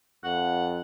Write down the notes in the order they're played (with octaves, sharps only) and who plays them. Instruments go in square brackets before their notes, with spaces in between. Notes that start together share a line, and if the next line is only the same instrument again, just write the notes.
[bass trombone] F2 [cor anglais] F#5